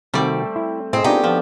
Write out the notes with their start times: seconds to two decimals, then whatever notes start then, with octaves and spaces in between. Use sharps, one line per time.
0.14 C3 D#3 G3 A3 C4 F#4 D5
0.56 E4
0.93 A2 C4 G#4 D#5
1.04 D3 A3 B3 C4 D#4 F4 G4
1.24 F3 B3